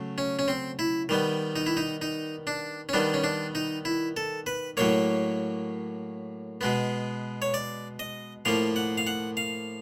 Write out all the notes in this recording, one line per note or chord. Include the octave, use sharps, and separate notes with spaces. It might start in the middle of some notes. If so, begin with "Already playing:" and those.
Already playing: C#3 F#3 A3
C#4
C#4
C4
E4
D#3 G3 B3
D#4
E4
D#4
D#4
D4
C#4
D#3 G3 B3 D4
C#4
D4
D#4
E4
A4
B4
A2 F#3 A#3 C#5
B2 G#3 B3
C#5
D5
D#5
A2 F3 A#3 F5
F#5
F5
F#5
F5